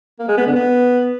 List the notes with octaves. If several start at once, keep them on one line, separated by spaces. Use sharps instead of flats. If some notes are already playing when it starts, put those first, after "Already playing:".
A#3
G#3
B3
D3
B3